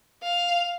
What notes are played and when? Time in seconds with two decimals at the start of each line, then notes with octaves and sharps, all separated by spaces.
0.23 F5